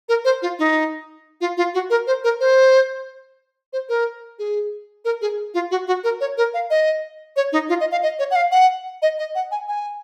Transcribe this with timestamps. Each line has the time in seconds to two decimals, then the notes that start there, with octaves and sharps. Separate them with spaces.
0.09 A#4
0.25 C5
0.42 F4
0.59 D#4
1.41 F4
1.57 F4
1.74 F#4
1.90 A#4
2.07 C5
2.24 A#4
2.40 C5
3.73 C5
3.89 A#4
4.39 G#4
5.05 A#4
5.22 G#4
5.54 F4
5.71 F#4
5.87 F#4
6.04 A#4
6.21 C#5
6.38 A#4
6.54 F5
6.70 D#5
7.36 C#5
7.53 D#4
7.69 F4
7.80 D#5
7.92 F5
8.03 D#5
8.19 C#5
8.31 F#5
8.36 F5
8.52 F#5
9.02 D#5
9.19 D#5
9.35 F#5
9.51 G#5
9.68 G#5